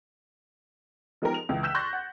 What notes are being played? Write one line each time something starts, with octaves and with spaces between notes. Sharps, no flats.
F3 G#3 B3 D#4 G4 A#4
F7
C#2 E3
E6 F#6 G6 B6 E7
C6 C#6 F#6 G6 A6 A#6
F#5